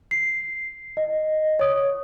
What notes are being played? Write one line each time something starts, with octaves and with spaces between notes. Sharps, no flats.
C7
D#5
C#5 D#6